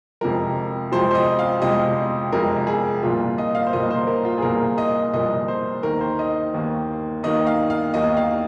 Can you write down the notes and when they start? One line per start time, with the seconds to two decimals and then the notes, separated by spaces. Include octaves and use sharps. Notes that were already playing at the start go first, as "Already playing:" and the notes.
0.21 F2 C3 F3 G#3 A#4
0.92 F2 C3 F3 G#3 C5
1.11 C5
1.15 D#5
1.39 F5
1.62 F2 C3 F3 G#3 D#5
2.32 F2 C3 F3 G#3 A#4
2.67 G#4
3.02 C2 A#2 F3 A#3 F4
3.38 D#5
3.55 F5
3.67 C5
3.73 C2 A#2 F3 A#3 D#5
3.91 C5
4.07 A#4
4.25 F4
4.38 G#4
4.42 C2 A#2 F3 A#3 A#4
4.78 D#5
5.14 C2 A#2 F3 A#3 D#5
5.48 C5
5.83 D#2 D#3 A#3 A#4
6.01 C5
6.19 D#5
6.54 D#2 D#3 A#3
7.23 D#2 D#3 A#3 D#5
7.47 F5
7.70 F5
7.94 D#2 D#3 A#3 D#5
8.17 F5